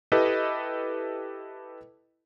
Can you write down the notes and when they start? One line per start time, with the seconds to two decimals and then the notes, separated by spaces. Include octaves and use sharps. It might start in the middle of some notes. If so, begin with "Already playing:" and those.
0.12 E4 G4 A4 B4 D#5